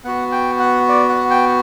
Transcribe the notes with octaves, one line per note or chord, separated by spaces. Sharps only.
B3 F#4 F#5
G5
F#5
D5
F#5
G5